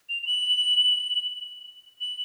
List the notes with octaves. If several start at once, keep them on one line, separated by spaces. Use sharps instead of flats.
F7
F7
F#7
F#7